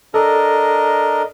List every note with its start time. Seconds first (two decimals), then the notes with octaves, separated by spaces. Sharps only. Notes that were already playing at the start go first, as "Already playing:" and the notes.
0.14 D4 A4 A#4 D#5